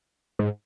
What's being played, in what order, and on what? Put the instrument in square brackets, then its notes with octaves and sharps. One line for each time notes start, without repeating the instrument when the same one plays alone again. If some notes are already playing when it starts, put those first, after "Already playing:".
[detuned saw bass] G#2